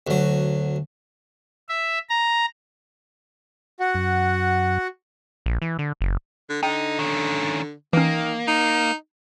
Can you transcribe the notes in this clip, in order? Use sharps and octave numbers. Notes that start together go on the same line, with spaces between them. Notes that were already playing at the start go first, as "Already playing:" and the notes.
D2 F#3
E5
A#5
F#4 F#5
F#2
A#1
E3
D3
F#1
D3
D3 D#4 G5
D#3 C#4
D#3 E3 A#3 C#4
D#4